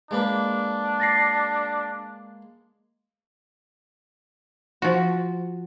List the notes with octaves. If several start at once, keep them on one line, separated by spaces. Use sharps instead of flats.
G#3 A#3 D4 B4
A6 A#6 C7
F3 F#4